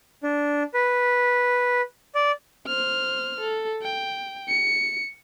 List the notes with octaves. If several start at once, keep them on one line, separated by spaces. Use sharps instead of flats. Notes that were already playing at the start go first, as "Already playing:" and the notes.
D4
B4
D5
C5 F6
A4
G5
C#7